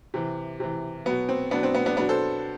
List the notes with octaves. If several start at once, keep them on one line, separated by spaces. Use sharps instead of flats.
C3 E3
C3 E3
B2 F#3 B3
C4
B2 F#3 B3 D4
C4
B3
B3 D4
B2 F#3 B3 D4
A4 C5